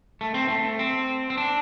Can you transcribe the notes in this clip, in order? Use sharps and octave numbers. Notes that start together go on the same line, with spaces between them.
A3
C4
A3
C4
C4
D4